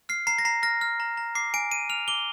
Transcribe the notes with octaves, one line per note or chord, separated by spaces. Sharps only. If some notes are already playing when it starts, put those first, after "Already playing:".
F6 C7
A#5 C7
A#6
A#5 C7
F6 A#6
F6
A#5
A#5
D6 C7
G#5 D7
G#5 D#7
F6 F7
D6 G7